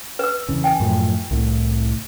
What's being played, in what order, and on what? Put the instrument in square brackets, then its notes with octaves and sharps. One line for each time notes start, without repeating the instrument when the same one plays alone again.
[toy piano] B4 E6
[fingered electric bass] E2 C#3
[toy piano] G5 G#5
[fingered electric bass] F#2 A2 F3
C2 A2